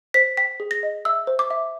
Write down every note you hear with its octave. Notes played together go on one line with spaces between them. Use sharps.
C5 B6
G5 B6
G#4
A#6
D#5
E5 E6
C5
D6
E5